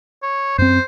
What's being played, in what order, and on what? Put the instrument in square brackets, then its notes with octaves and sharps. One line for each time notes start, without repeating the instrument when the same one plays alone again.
[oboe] C#5
[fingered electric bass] F#2 C4 [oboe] C5